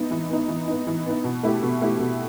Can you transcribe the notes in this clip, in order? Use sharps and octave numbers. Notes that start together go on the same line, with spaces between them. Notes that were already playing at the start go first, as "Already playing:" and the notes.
Already playing: E3 B3 D#4
E3
B3 D#4
E3
B3 D#4
E3
B3 D#4
B2
A3 E4 G4
B2
A3 E4 G4
B2